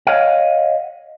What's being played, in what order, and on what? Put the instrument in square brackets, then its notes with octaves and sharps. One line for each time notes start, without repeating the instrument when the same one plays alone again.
[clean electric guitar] C#5 D#5 F5 F#5